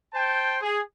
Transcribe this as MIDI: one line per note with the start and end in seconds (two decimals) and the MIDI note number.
0.13 0.57 72
0.13 0.57 79
0.13 0.57 81
0.62 0.81 68